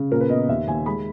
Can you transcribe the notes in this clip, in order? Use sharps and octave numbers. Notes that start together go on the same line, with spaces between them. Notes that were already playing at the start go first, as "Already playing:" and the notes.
Already playing: C#3
A#2 A#4
B4
B3 D#5
D#2 E5
D#2 G#5
G#3 B5